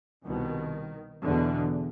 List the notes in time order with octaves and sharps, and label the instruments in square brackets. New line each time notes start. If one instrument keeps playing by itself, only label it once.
[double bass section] C2 B2 D#3
E2 B2 D3